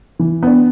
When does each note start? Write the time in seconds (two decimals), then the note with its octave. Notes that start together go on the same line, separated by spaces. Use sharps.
0.19 E3
0.43 B3 D4